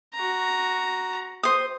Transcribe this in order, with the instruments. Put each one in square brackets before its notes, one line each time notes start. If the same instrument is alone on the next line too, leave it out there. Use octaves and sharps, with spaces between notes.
[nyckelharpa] F#4 A#5
[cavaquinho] C5 D#6